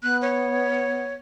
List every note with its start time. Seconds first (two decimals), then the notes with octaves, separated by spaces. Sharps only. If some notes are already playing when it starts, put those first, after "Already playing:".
0.03 B3 F#6
0.22 C#5